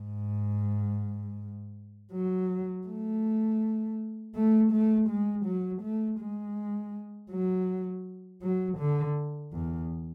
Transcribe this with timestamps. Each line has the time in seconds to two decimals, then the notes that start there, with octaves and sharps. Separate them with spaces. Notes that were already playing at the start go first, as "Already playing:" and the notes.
Already playing: G#2
2.13 F#3
2.87 A3
4.35 A3
4.72 A3
5.09 G#3
5.46 F#3
5.82 A3
6.19 G#3
7.31 F#3
8.42 F#3
8.78 D3
9.53 E2